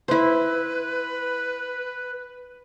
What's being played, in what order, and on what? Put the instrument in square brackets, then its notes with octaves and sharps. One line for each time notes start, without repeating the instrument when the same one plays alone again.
[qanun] E4 C5 [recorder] B4